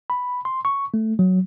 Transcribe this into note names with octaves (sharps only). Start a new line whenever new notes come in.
B5
C6
C#6
A3
F#3